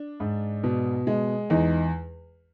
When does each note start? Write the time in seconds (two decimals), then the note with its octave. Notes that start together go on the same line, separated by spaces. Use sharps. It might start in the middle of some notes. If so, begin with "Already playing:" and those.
Already playing: D4
0.20 G#2
0.64 B2
1.07 G#3
1.50 E2 D#4